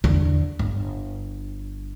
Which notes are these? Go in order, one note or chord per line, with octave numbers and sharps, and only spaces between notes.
E2 D3
G1